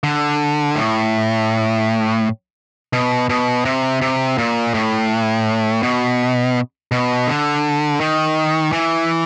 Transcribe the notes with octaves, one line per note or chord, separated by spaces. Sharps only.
D3
A2
B2
B2
C3
C3
A#2
A2
B2
B2
D3
D#3
E3